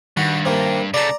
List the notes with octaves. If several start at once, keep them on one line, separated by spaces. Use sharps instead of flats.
G2 D#3 F#4
C3 A#3
C#3 A3 D5 A#5